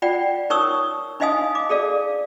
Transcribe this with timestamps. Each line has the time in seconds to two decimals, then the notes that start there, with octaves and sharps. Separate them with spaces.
0.02 F4 D5 F#5 G5
0.50 D#4 A#4 C#5 C#6 D#6 E6
1.20 D4 D#4 D#5 F5 G#5 D#6
1.55 D6
1.69 G#4 A4 D5 F5